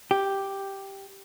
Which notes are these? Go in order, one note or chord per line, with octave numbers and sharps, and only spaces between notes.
G4